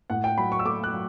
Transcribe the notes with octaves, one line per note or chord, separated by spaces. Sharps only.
A2 F#5
G5
F#3 B5
C#6
E6
A3 D6
F#6
F#3